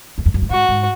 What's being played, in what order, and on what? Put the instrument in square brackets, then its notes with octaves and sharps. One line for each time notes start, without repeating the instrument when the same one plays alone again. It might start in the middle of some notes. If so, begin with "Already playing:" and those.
[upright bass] E2
F2
F#2
G2
[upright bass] G#2 [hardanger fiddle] F#4
[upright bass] G#2